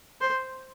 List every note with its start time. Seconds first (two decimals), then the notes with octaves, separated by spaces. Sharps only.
0.21 C5